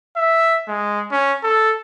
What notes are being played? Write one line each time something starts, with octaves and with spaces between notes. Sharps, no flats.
E5
G#3
C#4
A4